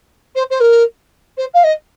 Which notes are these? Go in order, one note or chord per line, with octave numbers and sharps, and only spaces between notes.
C5
C5
A#4
C5
F5
D#5